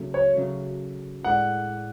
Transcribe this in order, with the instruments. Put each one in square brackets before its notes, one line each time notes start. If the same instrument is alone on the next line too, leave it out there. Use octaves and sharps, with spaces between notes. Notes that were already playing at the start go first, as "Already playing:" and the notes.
Already playing: [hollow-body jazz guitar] C#3 F#3 A3
[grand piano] C#5
[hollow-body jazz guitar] C#3 F#3 A3
[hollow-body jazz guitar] A2 G#3 D4 A4 D5 [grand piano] F#5